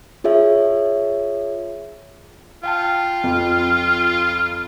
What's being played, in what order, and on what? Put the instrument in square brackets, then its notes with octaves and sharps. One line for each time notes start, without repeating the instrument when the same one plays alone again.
[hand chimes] F4 G#4 C#5 E5
[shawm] F4 [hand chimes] F5 G5 A5
[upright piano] F2